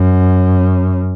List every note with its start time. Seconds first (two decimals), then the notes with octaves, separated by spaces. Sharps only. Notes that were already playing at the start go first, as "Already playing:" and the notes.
Already playing: F#2